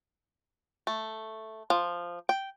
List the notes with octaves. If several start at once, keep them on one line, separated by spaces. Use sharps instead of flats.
A3
F3
G5